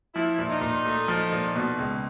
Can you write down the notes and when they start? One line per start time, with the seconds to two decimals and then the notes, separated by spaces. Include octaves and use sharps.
0.15 F3 E4
0.38 A#2
0.50 D#4
0.61 A#2
0.85 A3
1.08 F3
1.32 A#2
1.56 B2
1.79 C#2